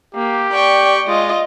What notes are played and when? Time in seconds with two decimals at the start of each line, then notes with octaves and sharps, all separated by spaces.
0.15 A#3 G4
0.53 D5 G5 C#6
1.08 G#3 F4 D#5